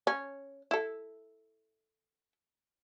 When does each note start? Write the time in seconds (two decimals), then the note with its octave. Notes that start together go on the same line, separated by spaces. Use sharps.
0.07 C#4
0.71 E4 A4